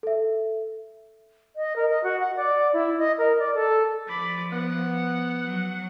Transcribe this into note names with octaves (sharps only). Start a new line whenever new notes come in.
A4 E5
D#5
A#4
D#5
F#4
F#5
D5
E4
D#5
A#4
D5
A4
F3 D5 B5
B3 F#5
F#3